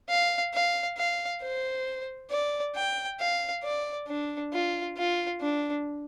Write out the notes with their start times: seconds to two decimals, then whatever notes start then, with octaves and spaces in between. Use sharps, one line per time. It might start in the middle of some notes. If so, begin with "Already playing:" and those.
0.09 F5
0.54 F5
0.97 F5
1.42 C5
2.31 D5
2.75 G5
3.20 F5
3.63 D5
4.08 D4
4.53 F4
4.97 F4
5.41 D4